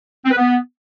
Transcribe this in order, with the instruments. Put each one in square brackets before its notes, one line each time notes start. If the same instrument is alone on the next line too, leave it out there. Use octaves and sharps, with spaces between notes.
[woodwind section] C4
B4
B3